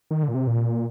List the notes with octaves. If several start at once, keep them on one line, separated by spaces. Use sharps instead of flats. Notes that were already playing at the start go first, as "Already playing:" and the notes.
D#3
D3
A#2
C3
A#2